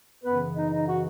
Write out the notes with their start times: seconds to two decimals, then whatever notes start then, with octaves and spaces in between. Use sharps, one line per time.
0.24 F#2 C#3 E3 B3 B4
0.55 D#4 D#5
0.72 D#4 D#5
0.87 F#4 F#5